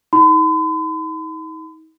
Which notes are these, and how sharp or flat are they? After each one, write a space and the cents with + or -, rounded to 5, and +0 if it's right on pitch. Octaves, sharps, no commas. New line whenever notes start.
D#4 +40 B5 +45